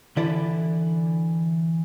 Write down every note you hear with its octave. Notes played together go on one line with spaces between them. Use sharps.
D3 E3 E4 A4 D5